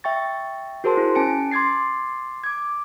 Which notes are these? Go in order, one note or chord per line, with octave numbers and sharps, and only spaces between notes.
E5 G5 C#6 A6
F#4 G#4 A#4 C5 A5 C6
E4
C#4 G#5 A5 C#7 D7
C6 D6 G#6 A6 C7
D6 G#6